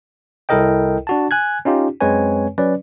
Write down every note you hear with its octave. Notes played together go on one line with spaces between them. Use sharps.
C2 E4 A4 A#4 D#5 G5
D4 F#4 A5
G#5 F#6 G#6
C#4 D#4 F4 G4
F#2 G#3 C4 B4 C#5 G#5
F#3 C#4 B4 D5